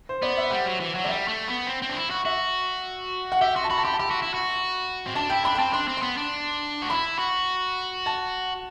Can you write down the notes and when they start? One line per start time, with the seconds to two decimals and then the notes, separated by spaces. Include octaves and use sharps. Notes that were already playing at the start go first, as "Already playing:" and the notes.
0.09 C5
0.22 B3 D5
0.37 E5
0.51 G3 F#5
0.66 F#3
0.80 E3
0.95 F#3
1.04 A3 D5
1.09 G3 E5
1.28 A3
1.48 B3
1.67 C4
1.82 C4
1.89 D4
1.96 E4
2.10 F#4
2.25 F#4 E5
3.32 F#5
3.41 G4 E5
3.56 F#4 C6
3.64 A5
3.70 F#4 B5
3.78 A5
3.85 G4 B5
3.93 A5
4.00 G4 B5
4.11 F#4
4.22 E4
4.34 F#4
5.07 C4
5.15 D4 A5
5.30 E4 G5
5.44 D4 B5
5.55 G5
5.58 C4 A5
5.73 D4 C6
5.88 C4
5.97 C6
6.02 B3
6.17 D4
6.82 F#4
6.90 E4 B5
7.19 F#4
8.06 A5